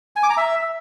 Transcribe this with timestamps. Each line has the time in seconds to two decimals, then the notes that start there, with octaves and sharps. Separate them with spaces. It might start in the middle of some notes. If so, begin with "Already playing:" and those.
0.16 G#5
0.23 D6
0.30 A#5
0.37 E5